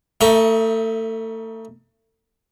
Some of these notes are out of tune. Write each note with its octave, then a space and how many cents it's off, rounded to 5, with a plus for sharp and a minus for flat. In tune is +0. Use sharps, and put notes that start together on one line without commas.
A3 +30 D#4 +35 E5 +0